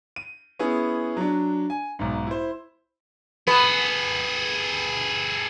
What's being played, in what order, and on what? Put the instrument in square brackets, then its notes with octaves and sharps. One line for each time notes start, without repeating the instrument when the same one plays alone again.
[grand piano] D#7
B3 C#4 E4 G#4
F#3 D4
G#5
B1 G#2
E4 C5
[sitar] B3 [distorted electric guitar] G#4 A4